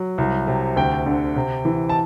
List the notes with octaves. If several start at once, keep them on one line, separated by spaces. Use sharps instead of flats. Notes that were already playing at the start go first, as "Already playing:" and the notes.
Already playing: F#3
C2
C3
D2 G5
D3
C3
E3
A5